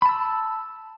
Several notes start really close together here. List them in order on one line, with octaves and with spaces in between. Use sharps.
B5 A5 E6